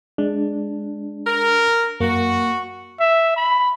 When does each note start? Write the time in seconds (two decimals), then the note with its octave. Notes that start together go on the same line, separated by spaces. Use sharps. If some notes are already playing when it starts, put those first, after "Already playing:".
0.18 G#3 D4
1.24 A#4
2.00 F#2 A#3 F#4
3.00 E5
3.37 B5